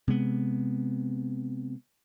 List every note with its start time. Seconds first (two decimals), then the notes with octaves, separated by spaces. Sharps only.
0.08 C3 G#3 B3